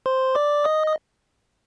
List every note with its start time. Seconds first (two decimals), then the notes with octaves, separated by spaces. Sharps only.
0.06 C5 C6
0.35 D5 D6
0.64 D#5 D#6
0.87 D#6